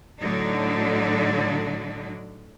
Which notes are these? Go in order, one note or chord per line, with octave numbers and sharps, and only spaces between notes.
A2 D3 F#3 D4 D#4